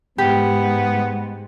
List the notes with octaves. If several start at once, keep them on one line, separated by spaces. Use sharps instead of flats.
G#2 G#3 B3 G4